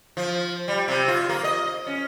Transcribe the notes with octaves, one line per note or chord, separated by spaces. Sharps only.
F3
G3
C3
F4
A#3
D#5
C#4